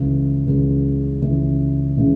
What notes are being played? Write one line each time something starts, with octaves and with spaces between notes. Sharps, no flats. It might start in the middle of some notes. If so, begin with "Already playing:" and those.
Already playing: C#2 C#3 E3
C#2 C#3 E3
C#2 C#3 E3
C#3 E3